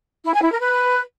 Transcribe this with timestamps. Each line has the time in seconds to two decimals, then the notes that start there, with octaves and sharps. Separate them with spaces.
0.25 E4
0.34 G#5
0.42 E4
0.51 A#4
0.60 B4